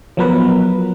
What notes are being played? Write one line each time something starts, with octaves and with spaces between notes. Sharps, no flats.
F3 F#3 B3 A#4 B4